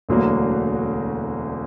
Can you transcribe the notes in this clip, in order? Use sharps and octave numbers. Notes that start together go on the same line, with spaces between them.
E1 D2 D3 F#3 A#3